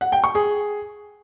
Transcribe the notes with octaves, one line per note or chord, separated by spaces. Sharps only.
F#5
G5
C#6
G#4